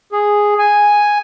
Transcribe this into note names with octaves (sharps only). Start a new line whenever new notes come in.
G#4
G#5